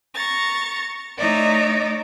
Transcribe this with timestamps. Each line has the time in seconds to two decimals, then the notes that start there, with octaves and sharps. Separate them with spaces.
0.14 A#5 C#6 A6
1.18 A3 D#4 C#5 D5 E5